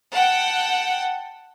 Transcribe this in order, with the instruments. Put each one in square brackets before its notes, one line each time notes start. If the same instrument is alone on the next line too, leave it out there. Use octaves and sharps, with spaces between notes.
[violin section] F#5 G5 [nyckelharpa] A5